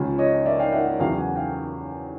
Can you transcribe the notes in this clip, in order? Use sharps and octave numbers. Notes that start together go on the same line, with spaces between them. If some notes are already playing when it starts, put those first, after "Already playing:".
Already playing: C#2 C#3 F3
C#5 D#5
D5 E5
F5 G5
E5 F#5
E2 C#3 F#3 F5 G5
F#5 G#5
F5 G5